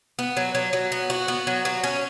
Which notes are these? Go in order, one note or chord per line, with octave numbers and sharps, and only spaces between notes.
B3
F#3
F#3
F#3
B3
F#4
B3
F#3
F#3
C#4